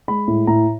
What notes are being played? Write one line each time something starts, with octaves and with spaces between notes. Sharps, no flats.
G#3 B5
A2
A2 A#5